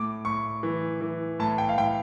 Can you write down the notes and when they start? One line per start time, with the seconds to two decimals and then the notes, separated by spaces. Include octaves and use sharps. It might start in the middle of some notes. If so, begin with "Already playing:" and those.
Already playing: A2 D6
0.25 A2 C#6
0.63 E3
1.01 E3
1.39 A2 A5
1.58 G5
1.69 F5
1.77 A2 G5